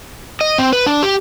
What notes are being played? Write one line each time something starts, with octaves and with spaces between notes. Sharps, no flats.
D#5
C4
B4
D4
G4